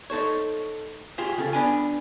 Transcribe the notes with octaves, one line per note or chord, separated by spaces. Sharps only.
D#4 A4 C5 C#5
F4 G4 G#4 C5
C#3 C#4 A4
B3 D4 G#5